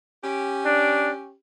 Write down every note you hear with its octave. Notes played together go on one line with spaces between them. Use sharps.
C#4 G4
D4